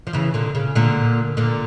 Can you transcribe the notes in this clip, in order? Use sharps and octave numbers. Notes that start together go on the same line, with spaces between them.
F3
C#3 E3
A#2 D3
C#3
A#2 D3
A#2 D3